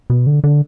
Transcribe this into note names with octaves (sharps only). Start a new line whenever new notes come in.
B2
D3
D3